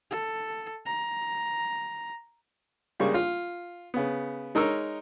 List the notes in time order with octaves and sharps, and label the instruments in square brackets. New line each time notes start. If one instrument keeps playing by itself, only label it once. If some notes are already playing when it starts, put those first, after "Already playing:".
[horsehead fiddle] A4
A#5
[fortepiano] C#3 G3 G#3 A#3 C#6
F4
C#3 B3
G#3 D#4 A#4 C#5 E6